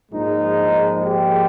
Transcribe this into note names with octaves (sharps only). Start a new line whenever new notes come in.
A#1 G#2 F3 G#3 D#4
G4